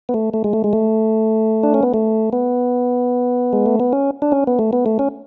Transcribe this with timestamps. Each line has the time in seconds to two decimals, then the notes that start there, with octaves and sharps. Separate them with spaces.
0.09 B3
0.14 A3
0.34 A3
0.44 G#3
0.53 A3
0.64 G#3
0.73 A3
1.63 D4
1.74 C#4
1.83 B3
1.94 A3
2.33 B3
3.53 G#3
3.66 A3
3.80 B3
3.93 C#4
4.22 D4
4.32 C#4
4.47 B3
4.59 A3
4.73 B3
4.86 A3
4.99 C#4